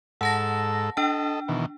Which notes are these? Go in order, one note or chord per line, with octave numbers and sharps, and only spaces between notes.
G#2 A4 F#5 A5 E6 A#6
D4 A4 D#5 G5
B2 D#3 E3